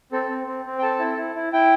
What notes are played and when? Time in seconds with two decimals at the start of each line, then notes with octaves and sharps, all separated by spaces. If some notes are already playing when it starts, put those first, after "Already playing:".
0.12 C4 A4
0.29 C4
0.47 C4
0.66 C4
0.78 G5
0.82 A4 A5
0.99 E4
1.17 E4
1.35 E4
1.53 E4 G5